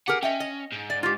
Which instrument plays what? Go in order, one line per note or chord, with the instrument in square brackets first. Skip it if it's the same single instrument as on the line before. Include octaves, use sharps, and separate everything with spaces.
[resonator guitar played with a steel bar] G4 G#4 A#4 [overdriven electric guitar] F#5
[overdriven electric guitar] C#4 [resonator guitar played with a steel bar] D#5 E5 G5
[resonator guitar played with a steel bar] D#5
[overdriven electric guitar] G#2
[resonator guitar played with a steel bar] D5
F4 G4